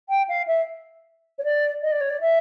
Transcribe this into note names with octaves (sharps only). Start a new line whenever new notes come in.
G5
F5
E5
C#5
D5
D#5
D5
C#5
D5
E5